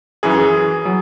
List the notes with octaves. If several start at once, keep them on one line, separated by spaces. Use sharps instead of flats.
F#2 E3 G#4
F#3